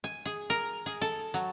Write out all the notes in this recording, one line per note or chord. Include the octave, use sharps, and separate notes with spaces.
G#5
G#4
A#4
G#4
A4
F#3